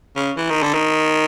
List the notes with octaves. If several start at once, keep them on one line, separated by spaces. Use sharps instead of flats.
C#3
E3
D#3
D3
D#3